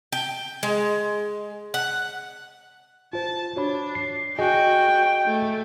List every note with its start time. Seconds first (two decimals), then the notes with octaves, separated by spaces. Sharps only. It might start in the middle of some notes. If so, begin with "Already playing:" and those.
0.12 G5
0.63 G#3
1.74 F#5
3.13 F4 C5 A5
3.56 D4 F#4 C#5 B5
3.95 C7
4.39 F#4 G#4 D#5 G5 G#5
5.26 A3